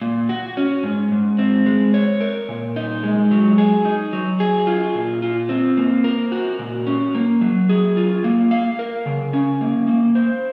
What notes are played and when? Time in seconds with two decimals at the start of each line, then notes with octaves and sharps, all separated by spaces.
0.02 A#2
0.29 F#4
0.57 C#4
0.84 G#2
1.12 G#2
1.39 C4
1.66 G#3
1.94 C#5
2.21 A#4
2.49 A#2
2.76 D#4
3.03 G#3
3.31 F#3
3.58 G#4
3.85 D#4
4.13 F#3
4.40 G#4
4.67 F4
4.95 A#2
5.22 F4
5.49 C4
5.77 A#3
6.04 A#4
6.32 F#4
6.59 A#2
6.87 C#4
7.15 A#3
7.41 F#3
7.69 G#4
7.97 F4
8.24 A#3
8.51 F5
8.79 A#4
9.06 C#3
9.33 C#4
9.61 A#3
9.88 A#3
10.15 C5